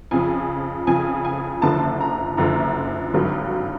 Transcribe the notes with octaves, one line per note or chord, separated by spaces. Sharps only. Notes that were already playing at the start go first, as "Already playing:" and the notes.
F2 C#3 F3 G#5
F2 C#3 F3 G#5
G#5
F#1 F#2 D3 F3 A5
A#5
F#1 F#2 D3 F3 A#5
G#1 G2 D3 F#3